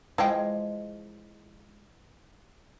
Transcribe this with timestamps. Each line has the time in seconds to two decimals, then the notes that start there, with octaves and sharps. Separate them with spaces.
0.18 E3 F3 G#3 G5